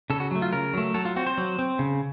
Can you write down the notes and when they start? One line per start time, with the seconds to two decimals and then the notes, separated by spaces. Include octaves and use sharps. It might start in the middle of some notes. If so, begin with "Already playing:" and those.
0.10 C#3 A4
0.20 F#4
0.31 F#3 A3
0.42 F4
0.53 C#3 A#4
0.74 F#3 A3
0.94 F#3 A4
1.05 F4
1.16 C4 F#4
1.26 C5
1.38 F#3
1.59 C4
1.79 C#3